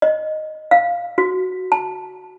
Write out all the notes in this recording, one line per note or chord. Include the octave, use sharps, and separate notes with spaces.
D#5
F5
F#4
A5